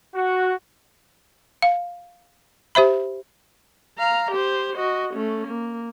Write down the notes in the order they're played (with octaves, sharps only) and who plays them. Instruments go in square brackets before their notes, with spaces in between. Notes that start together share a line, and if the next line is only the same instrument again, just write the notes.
[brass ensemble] F#4
[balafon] F5
G4 C5 E5 B5
[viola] F5 A#5
G4 C5
F#4 D#5
A3 C#4
A#3